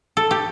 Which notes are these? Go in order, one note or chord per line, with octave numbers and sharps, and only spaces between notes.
A4
G4